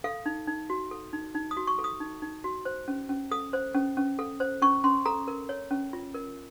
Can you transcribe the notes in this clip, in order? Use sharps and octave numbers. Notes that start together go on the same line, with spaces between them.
A4 F5
D#4
D#4
F#4
A4
D#4
D#4
D#6
F#4
C#6
A4
D#6
D#4
D#4
F#4
C5
C#4
C#4
A4 D#6
C5
C#4
C#4
A4
C5
C#4 C#6
C#4 C6
A4 A#5
A#4
C#5
C#4
F4
A#4